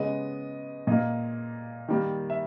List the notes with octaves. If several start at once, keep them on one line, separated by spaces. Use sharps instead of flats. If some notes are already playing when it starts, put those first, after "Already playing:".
Already playing: C#3 G#3 B3 D#5
A#2 A#3 D#5
D#3 G3 A#3
E5